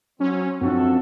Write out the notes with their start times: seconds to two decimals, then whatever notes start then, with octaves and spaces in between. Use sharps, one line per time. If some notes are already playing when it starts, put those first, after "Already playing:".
0.20 F#3 C4 C#4
0.61 F#2 F3 C4 D4 F#4 A4